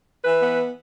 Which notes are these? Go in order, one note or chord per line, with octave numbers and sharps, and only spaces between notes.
E3 B4
B3